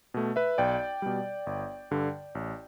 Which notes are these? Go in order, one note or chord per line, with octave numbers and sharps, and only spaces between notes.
B2 A3
B4 E5
B1 D5 G5
B2 G3
G1
G2 D3
A1